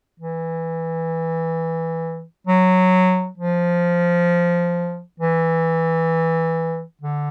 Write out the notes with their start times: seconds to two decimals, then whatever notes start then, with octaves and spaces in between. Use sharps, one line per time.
0.20 E3
2.47 F#3
3.38 F3
5.20 E3
7.01 D3